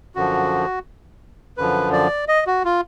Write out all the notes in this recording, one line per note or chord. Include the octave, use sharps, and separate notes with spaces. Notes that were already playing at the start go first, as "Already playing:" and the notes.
F#2 D3 F3 F#4
F#2 D3 F3 B4
D5
D#5
F#4
F4